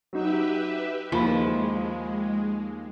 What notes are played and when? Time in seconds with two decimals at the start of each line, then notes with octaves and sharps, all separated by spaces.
0.13 F#3 D#4 G4 B4 E5
1.12 D#2 F3 G#3 B5